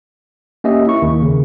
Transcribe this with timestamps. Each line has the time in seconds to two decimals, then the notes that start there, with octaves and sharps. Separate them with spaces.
0.64 A#3 C#4 G4 D#5 E5
0.87 E4 C#6
1.02 D#2 D#3 A#3
1.22 C#3